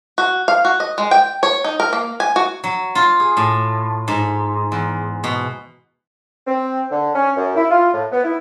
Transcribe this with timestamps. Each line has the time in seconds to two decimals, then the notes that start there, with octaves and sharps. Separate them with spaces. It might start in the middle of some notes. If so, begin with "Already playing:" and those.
0.18 F#4
0.48 F5
0.65 F#4
0.80 D#5
0.98 G#3
1.11 G5
1.43 C#5
1.64 D#4
1.80 A#4
1.93 A#3
2.20 G#5
2.36 F#4
2.64 F#3
2.95 F4
3.20 G#4
3.37 A2
4.08 G#2
4.72 E2
5.24 B2
6.47 C4
6.91 D3
7.15 C#4
7.36 F#2
7.56 E4
7.71 F4
7.94 A2
8.12 B3
8.24 E4